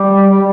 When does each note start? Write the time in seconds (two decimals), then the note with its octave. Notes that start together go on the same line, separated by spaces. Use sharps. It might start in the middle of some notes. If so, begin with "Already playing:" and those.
Already playing: G3 D6
0.30 G3